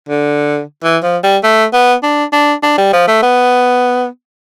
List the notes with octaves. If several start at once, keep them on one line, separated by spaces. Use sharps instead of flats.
D3
E3
F3
G3
A3
B3
D4
D4
D4
G3
F3
A3
B3